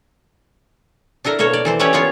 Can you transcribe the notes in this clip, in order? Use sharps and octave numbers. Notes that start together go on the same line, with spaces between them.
D4 E4 A4 A#4
B2 A#3 A4 A#4 C#5
D5
E3 A4 C5
C#4 E4 G4 B4 C#5 D5
A#3 B3 F4 C#5